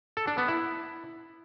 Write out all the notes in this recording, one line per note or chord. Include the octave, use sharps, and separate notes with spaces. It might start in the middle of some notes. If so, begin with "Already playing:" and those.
A4
D4
B3
E4